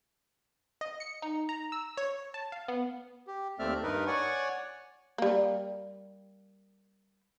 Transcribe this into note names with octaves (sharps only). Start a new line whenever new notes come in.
D#5
C#7
D#4
A#5
E6
C#5
A5
F5
B3
G4
D#2 A3 C4 D5 E5 F6
G2 D#4 A#4 B4
C#5 D5 F#5 G#5 C#6
G3 A#3